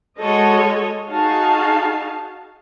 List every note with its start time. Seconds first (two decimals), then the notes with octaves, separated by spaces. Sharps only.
0.18 G#3 F#4 A4 C#5 D#5
1.10 D#4 F#4 G#4 F5 A5